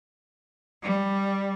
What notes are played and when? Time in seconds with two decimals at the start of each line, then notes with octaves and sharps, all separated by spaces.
0.84 G3